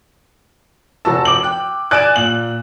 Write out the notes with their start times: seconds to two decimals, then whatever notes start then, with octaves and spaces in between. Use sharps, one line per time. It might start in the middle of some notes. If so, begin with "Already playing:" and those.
1.05 F1 F#4 A5 E6
1.25 D6 F#7
1.43 G5 F#6
1.91 D5 G#5 D#6 F#6 D7 E7
2.16 A#2 F#7